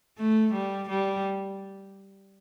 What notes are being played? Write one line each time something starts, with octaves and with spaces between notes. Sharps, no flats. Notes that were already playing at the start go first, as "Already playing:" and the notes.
A3
G3
G3